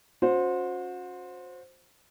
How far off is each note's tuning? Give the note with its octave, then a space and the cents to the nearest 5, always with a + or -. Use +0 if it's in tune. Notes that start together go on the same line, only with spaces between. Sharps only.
C#4 +5 F#4 -35 C5 +0